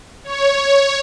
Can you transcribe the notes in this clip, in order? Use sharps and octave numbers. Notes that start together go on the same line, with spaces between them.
C#5